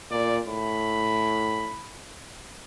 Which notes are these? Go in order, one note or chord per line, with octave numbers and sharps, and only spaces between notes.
A#2 D5
A2 B5